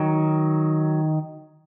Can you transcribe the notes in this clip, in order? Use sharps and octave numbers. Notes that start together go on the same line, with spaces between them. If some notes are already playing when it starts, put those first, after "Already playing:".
Already playing: D#3 F#3